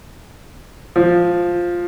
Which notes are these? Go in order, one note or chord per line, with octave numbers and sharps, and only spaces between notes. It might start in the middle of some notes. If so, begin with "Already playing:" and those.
F3